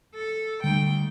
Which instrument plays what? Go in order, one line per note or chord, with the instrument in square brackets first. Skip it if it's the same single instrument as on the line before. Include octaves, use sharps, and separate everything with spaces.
[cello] A4
[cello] D2 G5 [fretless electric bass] D3 G3